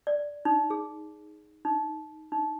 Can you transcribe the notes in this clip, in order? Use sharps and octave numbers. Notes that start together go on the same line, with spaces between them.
D5
D#4
G#4
D#4
D#4